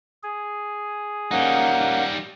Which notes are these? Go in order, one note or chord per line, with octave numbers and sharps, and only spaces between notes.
G#4
G3 A#3 C#4 D#4 F#5